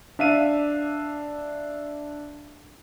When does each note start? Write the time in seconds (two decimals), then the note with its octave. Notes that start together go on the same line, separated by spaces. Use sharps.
0.19 D4 E5 F5 D#7